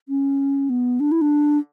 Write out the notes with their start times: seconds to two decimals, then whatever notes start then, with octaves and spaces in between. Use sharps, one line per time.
0.09 C#4
0.70 B3
1.00 D4
1.12 E4
1.21 D4